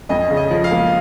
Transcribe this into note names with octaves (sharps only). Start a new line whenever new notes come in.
F2 D#5
C#3
D#5
F3
F5
A#3